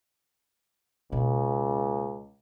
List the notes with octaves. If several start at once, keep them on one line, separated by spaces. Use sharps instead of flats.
C#2 B2 A#3